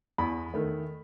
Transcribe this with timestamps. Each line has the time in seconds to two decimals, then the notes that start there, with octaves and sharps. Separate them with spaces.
0.18 E2 B5
0.54 D#3 A3